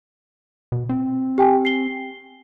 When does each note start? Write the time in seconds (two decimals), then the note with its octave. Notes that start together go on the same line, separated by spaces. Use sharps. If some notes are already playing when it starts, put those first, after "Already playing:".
0.72 B2
0.89 C4
1.38 G4 G5 G#5
1.65 C7 G7